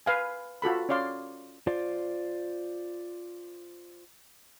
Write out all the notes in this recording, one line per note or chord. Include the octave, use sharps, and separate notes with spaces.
B4 F5 G#5
F4 F#4 A4 B5
C#4 C#5 D5 F5 C6
F4 C5 D5